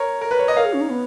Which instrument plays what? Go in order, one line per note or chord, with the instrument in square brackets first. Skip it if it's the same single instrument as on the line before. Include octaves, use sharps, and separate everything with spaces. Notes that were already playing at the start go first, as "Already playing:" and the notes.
Already playing: [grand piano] A#4 C#5
A#4
B4
C#5
D#5
[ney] A#4 [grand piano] C#5 F5
[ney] G#4
C#4
D#4
B3